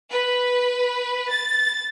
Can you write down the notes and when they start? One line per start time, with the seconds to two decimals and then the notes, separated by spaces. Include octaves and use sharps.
0.11 B4
1.31 A6